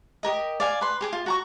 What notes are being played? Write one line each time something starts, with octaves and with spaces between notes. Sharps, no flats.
G4 A#4 D#5
D5 F5 G#5
B4 C6
G4 G#4 D6
F4
F#4 A#5 C#6